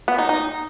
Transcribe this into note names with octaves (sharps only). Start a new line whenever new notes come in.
B3
D#4
D#4